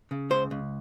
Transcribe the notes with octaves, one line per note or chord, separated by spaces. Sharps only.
C#3
C#2 C5
C#2